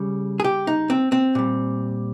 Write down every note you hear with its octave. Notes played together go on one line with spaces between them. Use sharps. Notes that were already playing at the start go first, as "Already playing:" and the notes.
Already playing: C#3 G3
G#4
G4
D#4
C4
C4
A#2 G3